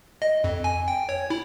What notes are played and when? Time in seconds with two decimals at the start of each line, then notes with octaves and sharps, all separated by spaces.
0.22 D#5
0.44 F2
0.64 G#5
0.88 G5
1.09 C#5
1.30 E4